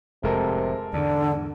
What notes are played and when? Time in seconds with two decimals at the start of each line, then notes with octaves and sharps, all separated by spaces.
0.23 F1 A2 C3 G#3 A4 A#4
0.93 E2 G#2 D3 D4